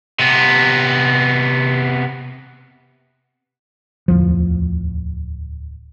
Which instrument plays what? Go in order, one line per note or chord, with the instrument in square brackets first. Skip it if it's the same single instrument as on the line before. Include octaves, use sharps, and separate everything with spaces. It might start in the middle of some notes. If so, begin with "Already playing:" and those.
[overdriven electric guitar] C3 B3
[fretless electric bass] D1 E2 F3